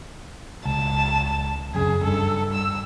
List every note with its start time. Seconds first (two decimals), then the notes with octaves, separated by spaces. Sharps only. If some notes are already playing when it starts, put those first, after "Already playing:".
0.65 C#2 A5
1.75 F#2 C#3 G#4
2.04 G2 A4
2.54 E6